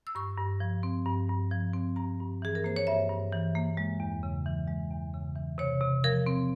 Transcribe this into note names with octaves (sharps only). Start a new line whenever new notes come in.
E6
G2 C#6
G2
F3
C4
G2
G2
F3
C4
G2 A#5
G2
E3 G#4
A#4
A#3 C5
C#5
G2 E5
G2
E3
A#3
G#3
E2
C#3
E3
G#3
E2
C#3
E3
C3 C#5
C3
F3 A#4
C4